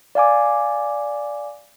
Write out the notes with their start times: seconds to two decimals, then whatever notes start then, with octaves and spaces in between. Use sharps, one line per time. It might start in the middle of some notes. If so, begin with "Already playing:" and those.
0.15 D5 F5 G#5 D6